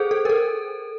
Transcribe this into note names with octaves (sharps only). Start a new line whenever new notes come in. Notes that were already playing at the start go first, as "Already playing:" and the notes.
Already playing: G#4 A4 C5
A4
A#4
A4